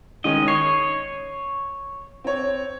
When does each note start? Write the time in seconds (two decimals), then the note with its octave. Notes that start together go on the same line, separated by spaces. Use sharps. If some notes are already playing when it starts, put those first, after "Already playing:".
0.24 D#3 G#3 C#4 D#5
0.48 C#5 C7
2.24 C4 C#5